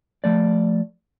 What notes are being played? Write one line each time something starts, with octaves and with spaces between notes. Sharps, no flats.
F3 A3 D5